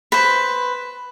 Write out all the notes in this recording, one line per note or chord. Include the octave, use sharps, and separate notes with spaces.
B4 C5